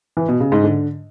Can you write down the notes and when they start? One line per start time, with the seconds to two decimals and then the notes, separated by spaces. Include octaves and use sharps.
0.17 E3
0.28 B2
0.40 C#3
0.52 G#2
0.64 D3